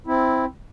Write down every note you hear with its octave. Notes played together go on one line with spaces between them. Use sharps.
C4 E4